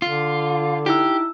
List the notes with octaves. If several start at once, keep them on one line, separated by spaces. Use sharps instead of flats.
D3 F4
D#4 E4 G4 E6